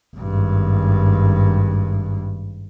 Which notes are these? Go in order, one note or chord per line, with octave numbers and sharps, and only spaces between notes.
G#1 G2